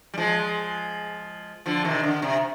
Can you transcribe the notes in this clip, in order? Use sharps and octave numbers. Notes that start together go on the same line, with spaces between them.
G3
F3 G#3
D3 F3
C3 D#3
D3
C3